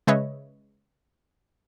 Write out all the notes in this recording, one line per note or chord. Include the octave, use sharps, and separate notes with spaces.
C#3 G#3 B4 C#5 D#5 E5